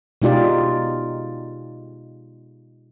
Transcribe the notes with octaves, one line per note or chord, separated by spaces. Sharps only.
B2 G#3 D#4 F4 G4 D5